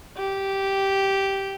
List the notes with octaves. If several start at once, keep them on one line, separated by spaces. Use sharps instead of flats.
G4